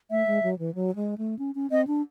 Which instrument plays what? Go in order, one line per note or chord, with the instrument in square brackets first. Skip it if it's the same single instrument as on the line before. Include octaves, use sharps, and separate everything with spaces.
[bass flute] A3 [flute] E5
[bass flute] G#3
F#3
E3
F#3
G#3
A3
C#4
C#4
[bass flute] C4 [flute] D#5
[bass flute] D4